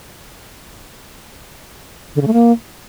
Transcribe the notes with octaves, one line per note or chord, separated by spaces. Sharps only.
D3
C#3
A3
A#3